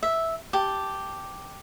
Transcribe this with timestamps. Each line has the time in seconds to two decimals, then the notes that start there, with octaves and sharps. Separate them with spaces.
0.03 E5
0.53 G4 A5